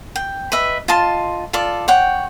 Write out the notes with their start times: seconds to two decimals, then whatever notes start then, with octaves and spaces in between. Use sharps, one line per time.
0.16 G5
0.52 B4 D#5 E5
0.88 F4 D#5 A5 C6
1.53 F4 A4 D5
1.88 C#5 F#5 G5